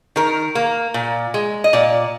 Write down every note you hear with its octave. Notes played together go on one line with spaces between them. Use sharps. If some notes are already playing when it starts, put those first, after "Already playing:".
D#3 A#4
A#3
A#2
G#3
D#5
A#2 D5